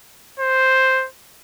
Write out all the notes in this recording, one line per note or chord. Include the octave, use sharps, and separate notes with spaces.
C5